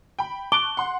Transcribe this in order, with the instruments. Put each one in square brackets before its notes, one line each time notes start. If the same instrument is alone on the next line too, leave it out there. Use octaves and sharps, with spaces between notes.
[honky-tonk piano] G5 B5
[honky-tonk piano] A5 C#6 F#6 [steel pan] D6 [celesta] G7
[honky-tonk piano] F#5 C6